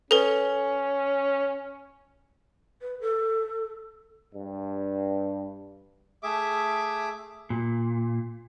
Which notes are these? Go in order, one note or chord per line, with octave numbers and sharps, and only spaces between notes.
C#4 A4 B4
B4
A4
G2
A3 G#4 E5 D6
A#2